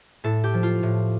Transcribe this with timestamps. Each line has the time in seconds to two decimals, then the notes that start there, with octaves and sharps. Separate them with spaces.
0.24 A2 A4
0.44 G4
0.54 F3
0.63 F4
0.83 A2